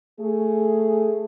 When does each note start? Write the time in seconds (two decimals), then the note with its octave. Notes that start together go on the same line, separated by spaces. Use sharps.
0.20 A3 G#4